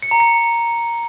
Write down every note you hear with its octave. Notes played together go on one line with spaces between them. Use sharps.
C#7
A#5
C#7